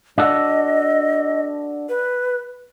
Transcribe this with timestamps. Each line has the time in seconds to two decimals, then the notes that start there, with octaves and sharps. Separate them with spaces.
0.18 D4 F#4 A4 D#5
1.89 B4